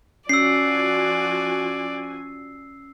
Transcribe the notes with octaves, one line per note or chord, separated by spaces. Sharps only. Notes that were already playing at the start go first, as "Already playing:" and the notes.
F3 C#4 F#4 D5 G#5 E6 C7